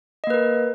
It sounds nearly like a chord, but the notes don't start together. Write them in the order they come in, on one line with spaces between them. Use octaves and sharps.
D#5 A#3 B4 A#4